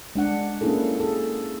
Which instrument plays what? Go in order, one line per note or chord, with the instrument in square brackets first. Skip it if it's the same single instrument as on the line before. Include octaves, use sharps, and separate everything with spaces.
[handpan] G#3 D4 F#5
A#3 C#4 D4 E4 G#4 A4
G#4 A4